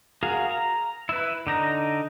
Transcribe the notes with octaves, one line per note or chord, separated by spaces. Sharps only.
F#4 G#4 A#4 F5
A#5
E4 B4
D3 D#4 A#5